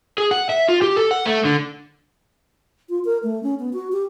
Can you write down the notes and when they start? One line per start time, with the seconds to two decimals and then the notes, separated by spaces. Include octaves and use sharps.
0.18 G#4
0.31 F#5
0.49 E5
0.69 F4
0.82 G4
0.96 A4
1.11 F#5
1.25 A3
1.45 D3
2.89 F4
3.05 A#4
3.23 A3
3.43 C#4
3.59 B3
3.73 F#4
3.92 G4